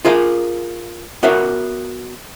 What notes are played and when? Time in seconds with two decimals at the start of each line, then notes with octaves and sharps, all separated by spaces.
0.05 F4 G#4 A#4 F5
1.23 B3 F#4 A#4 C#5 E5 F5